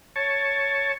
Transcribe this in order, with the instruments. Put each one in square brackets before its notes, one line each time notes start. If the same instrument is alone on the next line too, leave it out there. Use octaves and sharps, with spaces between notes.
[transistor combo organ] C#5 A5